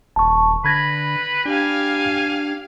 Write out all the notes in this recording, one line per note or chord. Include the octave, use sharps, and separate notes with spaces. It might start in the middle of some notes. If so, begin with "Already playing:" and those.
D#1 A5 C#6
D3 B4 B5 G#6 A#6
D4 G4 F5 G#5